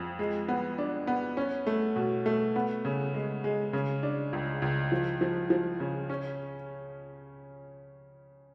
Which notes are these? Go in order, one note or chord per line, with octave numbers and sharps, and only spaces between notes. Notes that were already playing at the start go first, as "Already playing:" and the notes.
Already playing: F2
G#3
B3
D4
B3
C#4
A3
B2
A3
B3
C#3
G#3
G#3
C#3
D4
C#2
C#2
F3
F3
F3
C#3
C#4